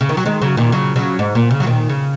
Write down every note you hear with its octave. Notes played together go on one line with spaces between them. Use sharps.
C#3
D#3
F#3
D#3 G#3
C#3 F#3
A#2 D#3
C#3 F#3
C#3 F#3
G#2
A#2
C#3
F#3
A#2 D#3
C#3